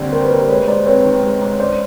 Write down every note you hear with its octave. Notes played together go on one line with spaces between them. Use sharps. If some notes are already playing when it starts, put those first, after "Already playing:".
Already playing: D#2 D3 G3 C4
G3 A#4 C5
B4
D#2 A#4 C5
G#3 B4 C#5
G#2 C5 D5
C4 B4 C#5
D#3
G#3
G#2
C#4 C5 D5